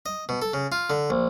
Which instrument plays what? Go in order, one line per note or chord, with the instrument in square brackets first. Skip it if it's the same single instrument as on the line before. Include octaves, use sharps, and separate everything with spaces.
[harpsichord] D#5
B2
A4
C#3
F4
D3
A#1